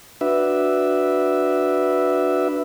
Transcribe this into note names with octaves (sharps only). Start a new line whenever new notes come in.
D4 F#4 B4 E5